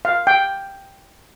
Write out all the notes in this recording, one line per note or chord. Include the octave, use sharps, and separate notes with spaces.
F5
G5